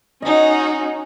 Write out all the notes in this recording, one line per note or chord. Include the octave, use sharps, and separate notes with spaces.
C#4 D#4 F#4 D#5 G#5